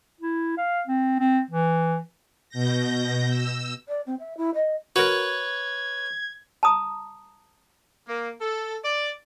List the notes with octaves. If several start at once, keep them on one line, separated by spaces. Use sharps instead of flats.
E4
F5
C4
C4
E3
B2 G6 A#6
E6
D5
C4
E5
E4
D#5
F#4 A#4 B4 C#5 G#6
A5 A#5 D#6
A#3
A4
D5